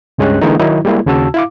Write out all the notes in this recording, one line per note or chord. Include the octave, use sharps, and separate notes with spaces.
C#2 G2 G#3 C#4 G4 F#6
D3 E3 G#3 A#3 D4 D#4
D#3 F#3 D#4 E4
G3 G#3 A#3 E4
D#2 C#3 F#4 A5 E6
E4 F5 D6